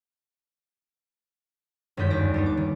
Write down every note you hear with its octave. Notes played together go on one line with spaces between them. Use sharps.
G1 F#2 D#3 G#3 G6 B6
D#2 D5 A#6 D7
G3 B3 D#4
D6
D#3